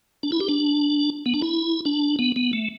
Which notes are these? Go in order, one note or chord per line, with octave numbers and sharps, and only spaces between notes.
D4
E4
G4
D4
B3
D4
E4
D4
B3
B3
A3